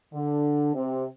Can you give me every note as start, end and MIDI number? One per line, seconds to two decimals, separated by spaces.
0.13 0.71 50
0.75 1.05 48